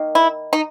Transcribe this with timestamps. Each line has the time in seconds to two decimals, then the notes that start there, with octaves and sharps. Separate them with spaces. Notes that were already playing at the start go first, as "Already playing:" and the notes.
Already playing: D#3 A#3
0.15 E4
0.53 D#4